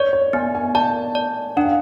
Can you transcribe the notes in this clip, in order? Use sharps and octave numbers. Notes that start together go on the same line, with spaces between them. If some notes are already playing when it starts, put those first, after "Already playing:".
Already playing: C#5 D5
C#5
B3 G#5
G#5
D5 A5
D5
D4 F#5
F5